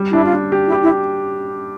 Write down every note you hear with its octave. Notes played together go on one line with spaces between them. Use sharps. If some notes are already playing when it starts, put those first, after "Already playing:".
Already playing: G3
D4 E4
F4
D4
G4
E4
G4
E4